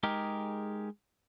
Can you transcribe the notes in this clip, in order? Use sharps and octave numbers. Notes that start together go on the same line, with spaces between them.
G#3 D#4 G4 G#4 A#4